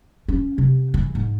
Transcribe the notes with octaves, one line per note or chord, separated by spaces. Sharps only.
C#4
C3
E3
G#2